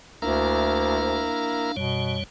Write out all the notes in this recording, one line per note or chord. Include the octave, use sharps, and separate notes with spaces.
D2 A#3 D4 E4 A#4 F5
F#2 B2 G3 C#5